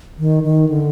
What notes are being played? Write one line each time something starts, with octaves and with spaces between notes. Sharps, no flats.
D#3
D#3
D3